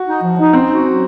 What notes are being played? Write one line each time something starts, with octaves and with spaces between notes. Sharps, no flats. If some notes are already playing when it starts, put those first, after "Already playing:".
Already playing: F#4
D#4
F3
D#4
C4 C#4
F#4
F#3